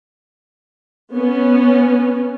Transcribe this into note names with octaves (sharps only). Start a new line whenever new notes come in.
B3 C#4